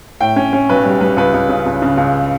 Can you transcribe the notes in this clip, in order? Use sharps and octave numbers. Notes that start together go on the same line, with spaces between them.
A2 G5
C#4
C#4
B1 B4
G3
G3 B4
C#2 B4
C#2
C#3
C#2
C#3
C#2